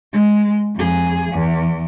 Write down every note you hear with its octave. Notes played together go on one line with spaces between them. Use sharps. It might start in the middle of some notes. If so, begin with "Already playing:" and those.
G#3
F2 G#4
E2